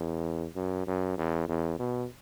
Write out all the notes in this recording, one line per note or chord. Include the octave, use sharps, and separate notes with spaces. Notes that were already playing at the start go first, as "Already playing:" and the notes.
Already playing: E2
F#2
F#2
E2
E2
B2